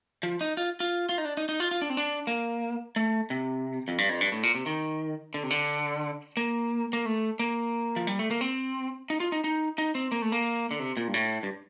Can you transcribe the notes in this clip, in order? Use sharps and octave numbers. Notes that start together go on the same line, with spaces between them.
F3
D#4
F4
F4
F4
D#4
D4
D#4
D#4
F4
F4
D4
C4
D4
A#3
A3
C3
F2
G2
F2
G2
A2
A#2
C3
D#3
D3
C3
D3
A#3
A#3
A3
A#3
F3
G3
A3
A#3
C4
D#4
F4
D#4
D#4
D#4
C4
A#3
A3
A#3
D3
C3
A#2
G2
A2
G2